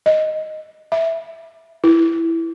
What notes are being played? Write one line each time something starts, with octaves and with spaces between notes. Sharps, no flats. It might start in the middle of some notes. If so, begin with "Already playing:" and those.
D#5
E5
E4